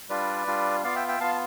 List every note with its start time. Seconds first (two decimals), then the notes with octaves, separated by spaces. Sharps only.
0.09 G3 D4 F4 B4 D5
0.47 G3 D4 F4
0.83 B3 F4 D5 F5
0.96 E5 G5
1.08 E5 G5
1.20 B3 F4 F5 A5